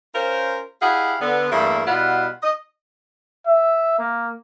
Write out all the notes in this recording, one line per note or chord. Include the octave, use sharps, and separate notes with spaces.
C#4 F4 A#4 C5
E4 G4 G#4 D#5 F5 F#5
D3 B3
E2 G2 A3 A#3 E5
B2 G3 E4 F4 F#5
D#5
E5
A#3